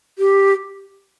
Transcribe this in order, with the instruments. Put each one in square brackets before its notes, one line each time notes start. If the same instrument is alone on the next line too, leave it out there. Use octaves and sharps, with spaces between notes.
[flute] G4